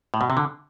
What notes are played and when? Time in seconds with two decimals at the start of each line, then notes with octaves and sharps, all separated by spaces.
0.14 A2
0.21 B2
0.30 C3
0.37 D3